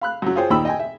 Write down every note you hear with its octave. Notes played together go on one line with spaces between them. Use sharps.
F5 B5 F#6
F#2 F#3
F4 G#4 C5 C#5 G5
D#2 A#2 D#4 G5 B5 E6
D#5 G5 G#5
E5